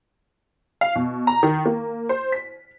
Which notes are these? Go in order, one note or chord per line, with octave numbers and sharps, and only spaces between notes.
F5
B2
A#5
D#3
A#3
C5
B6